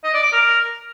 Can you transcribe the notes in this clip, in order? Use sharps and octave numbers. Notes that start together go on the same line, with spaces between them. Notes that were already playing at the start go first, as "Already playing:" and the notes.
D#5
D5
D6
A#4